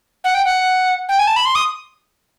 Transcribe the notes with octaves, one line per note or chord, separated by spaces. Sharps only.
F#5
G5
F#5
G5
G#5
A5
B5
C6
D#6